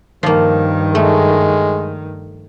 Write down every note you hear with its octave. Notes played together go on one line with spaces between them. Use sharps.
G2 D#3 F3 A#3
G#3 A3